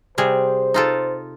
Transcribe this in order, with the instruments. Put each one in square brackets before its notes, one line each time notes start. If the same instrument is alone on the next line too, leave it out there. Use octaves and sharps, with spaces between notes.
[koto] C3 G3 G#4 [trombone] C5
[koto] D#4 F4 A4